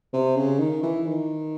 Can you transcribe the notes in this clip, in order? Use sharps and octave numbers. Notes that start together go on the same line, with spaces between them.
C3
C#3
D#3
E3
D#3